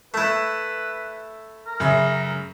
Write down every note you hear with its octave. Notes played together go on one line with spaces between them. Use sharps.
A3 E4 B4
A#4
F#2 C#3 E5